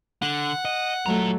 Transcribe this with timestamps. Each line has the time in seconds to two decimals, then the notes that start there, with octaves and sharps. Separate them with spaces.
0.22 D3 F#5
0.65 D#5
1.06 F#3 A3 F4 A#5